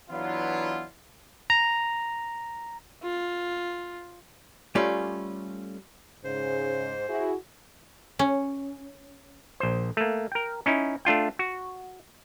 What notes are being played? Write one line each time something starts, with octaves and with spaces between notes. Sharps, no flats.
E3 F#3 B3 D4 E4 F4
A#5
F4
G3 A3 C#4 F4 D5
G#2 C#3 C5
E4 F#4 G#4
C#4
A#1 C5
A3 A#3
A#4 G5
C#4 D#4 E4
A3 D4 F4 G5
F#4